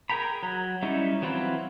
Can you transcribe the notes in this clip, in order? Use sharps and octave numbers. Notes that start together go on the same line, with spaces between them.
G#4 A#4 G5 A#5 B5
F#3
G3 C#4 D#4 E4
E3 F#3 C4 F4 B4